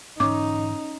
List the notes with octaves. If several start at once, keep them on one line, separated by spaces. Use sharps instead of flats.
G#2 D3 E3 C#4 D#4 D6